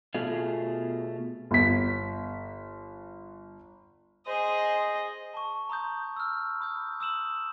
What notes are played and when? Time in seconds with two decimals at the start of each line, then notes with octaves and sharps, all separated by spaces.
0.14 B2 A3 F4 G#4 F5
1.51 G1 B6
4.27 G#4 C5 D#5
5.34 A5 C#6
5.69 A#5 C6 D#6 G6
6.16 E6 F6
6.60 B5 D#6 G6
7.00 D#6 E6 E7 F#7